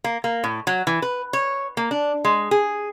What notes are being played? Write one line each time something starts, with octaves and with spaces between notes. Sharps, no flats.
A#3
A#3
A2
F#3
E3
B4
C#5
A#3
D4
G#3
G#4